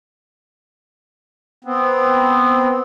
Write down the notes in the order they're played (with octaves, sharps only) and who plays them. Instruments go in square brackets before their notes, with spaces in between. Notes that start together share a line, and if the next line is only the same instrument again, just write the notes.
[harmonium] B3 C4